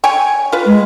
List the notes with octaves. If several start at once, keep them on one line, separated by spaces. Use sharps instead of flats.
C#5 G5 G#5
F4 B4
G#3